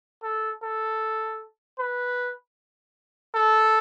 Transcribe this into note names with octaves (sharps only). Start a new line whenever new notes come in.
A4
A4
B4
A4